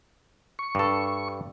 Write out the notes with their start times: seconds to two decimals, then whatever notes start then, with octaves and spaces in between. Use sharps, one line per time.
0.59 C#6
0.75 G2 A4